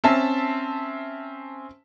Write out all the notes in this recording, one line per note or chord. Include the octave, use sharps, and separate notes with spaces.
C4 C#4 E5 A5